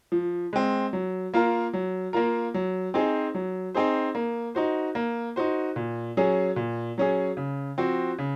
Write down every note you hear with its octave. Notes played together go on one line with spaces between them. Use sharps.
F3
G#3 C4
F#3
A#3 F4 A#4
F#3
A#3 F4 A#4
F#3
C4 D#4 G#4 C5
F#3
C4 D#4 G#4 C5
A#3
D#4 F#4 C5
A#3
D#4 F#4 C5
A#2
F#3 C#4 G#4
A#2
F#3 C#4 G#4
C#3
F3 C4 F#4
C#3